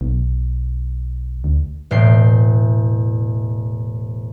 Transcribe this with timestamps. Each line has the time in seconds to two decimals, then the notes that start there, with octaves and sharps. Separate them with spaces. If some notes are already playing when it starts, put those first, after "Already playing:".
0.01 B1
1.44 D2
1.91 E1 A2 G5 C7